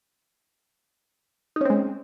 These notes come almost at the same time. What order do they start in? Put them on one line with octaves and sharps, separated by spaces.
D#4 C#4 C4 G#3